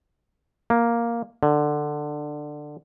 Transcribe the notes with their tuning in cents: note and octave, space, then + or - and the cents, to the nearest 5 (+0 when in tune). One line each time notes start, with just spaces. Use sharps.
A#3 +5
D3 +15